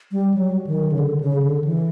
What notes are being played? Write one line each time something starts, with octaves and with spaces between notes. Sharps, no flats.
G3
F#3
D#3
C#3
D3
C#3
D3
E3